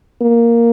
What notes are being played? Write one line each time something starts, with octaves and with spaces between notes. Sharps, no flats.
A#3